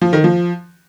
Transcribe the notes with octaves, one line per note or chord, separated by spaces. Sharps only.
F3
D#3
F3